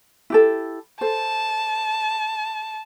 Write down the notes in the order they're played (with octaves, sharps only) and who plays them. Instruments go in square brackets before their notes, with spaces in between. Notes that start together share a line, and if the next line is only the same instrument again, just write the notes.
[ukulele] E4 G4 A4
[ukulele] A4 C5 [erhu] A5